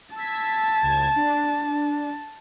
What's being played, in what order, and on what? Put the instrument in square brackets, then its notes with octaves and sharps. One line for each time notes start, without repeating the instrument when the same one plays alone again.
[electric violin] A5 [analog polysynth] E6 G#6 B6
[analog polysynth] C#2 G#6 E7
D4